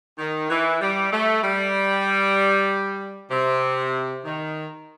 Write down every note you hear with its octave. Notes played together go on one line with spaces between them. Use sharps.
D#3
E3
G3
A3
G3
C3
D#3